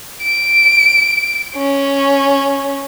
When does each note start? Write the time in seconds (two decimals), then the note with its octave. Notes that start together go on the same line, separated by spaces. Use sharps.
0.23 D7
1.56 C#4